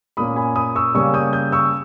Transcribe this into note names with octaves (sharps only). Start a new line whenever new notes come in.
A#2 A#3 C#4 B5 D#6
G#5 B5
B5 D#6
C#6 E6
C#3 G3 A#3 C#4 C#6 E6
D#6 G6
D#6 G6
C#6 E6